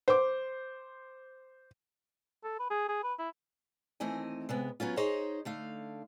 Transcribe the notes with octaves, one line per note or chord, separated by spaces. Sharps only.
C5 D6
A4
B4
G#4
G#4
B4
E4
D#2 E3 A3 C4 D#5 G#5
C3 G#3 B3
F#3 B3 C#4 F4
D#4 G#4 C5 C#5 D#5
D3 A3 F5